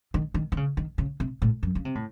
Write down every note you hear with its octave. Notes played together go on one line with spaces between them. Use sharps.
D#3
D#3
D#3
C#3
D#3
C#3
C3
A2
F#2
C#3
C3
A2